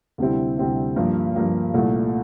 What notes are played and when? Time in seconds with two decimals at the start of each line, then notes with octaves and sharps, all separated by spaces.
0.18 D2 C3 G3 C4 E4
0.58 D2 C3 G3 C4 E4
0.96 G2 F3 A#3
1.36 G2 F3 A#3
1.74 C2 A#2 A3